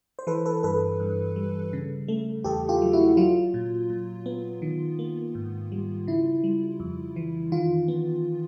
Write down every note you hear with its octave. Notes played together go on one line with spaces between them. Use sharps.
C5
E3 A4 B4
A4 B4
G2 A4 B4
G2
G3
C#3
A3
E2 G4 A4
F4 G4
F#3
E4 F#4
F#3 F4
A#2
A#2
B3
D#3
A#3
G#2
G3
C#3 E4
G3
F2
E3
D#3 F4
B3